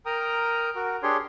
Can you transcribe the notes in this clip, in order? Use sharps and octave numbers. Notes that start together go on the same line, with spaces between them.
A#4 G5 A#5 D#6 F6
F#4 A#4
D4 G4 G#4 C#5 C6